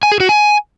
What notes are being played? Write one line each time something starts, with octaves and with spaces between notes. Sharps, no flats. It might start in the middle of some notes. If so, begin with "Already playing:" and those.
G#5
G#4
F#4
G#5